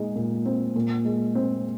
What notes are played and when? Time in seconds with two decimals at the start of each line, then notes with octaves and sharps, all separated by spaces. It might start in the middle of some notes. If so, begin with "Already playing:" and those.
Already playing: A#2 G#3 D#4
0.15 A#2
0.46 C4
0.76 A#2
1.05 G#3
1.35 C4